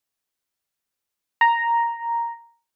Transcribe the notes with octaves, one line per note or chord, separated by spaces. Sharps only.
A#5